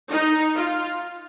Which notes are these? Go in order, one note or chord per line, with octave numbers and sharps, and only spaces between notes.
D#4
F4